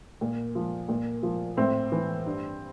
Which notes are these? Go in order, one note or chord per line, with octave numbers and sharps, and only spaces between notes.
A#2
F3
A#2
F3
A2 C4
E3
G2